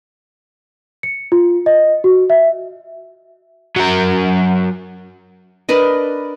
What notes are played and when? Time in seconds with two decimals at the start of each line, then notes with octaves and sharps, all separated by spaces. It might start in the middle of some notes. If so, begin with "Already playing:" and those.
1.03 C#7
1.32 F4
1.66 D#5
2.04 F#4
2.30 E5
3.76 F#3 A#4
5.69 D4 A#4 B4 D#5